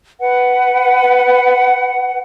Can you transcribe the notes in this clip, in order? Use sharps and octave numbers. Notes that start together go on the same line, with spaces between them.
B4 F#5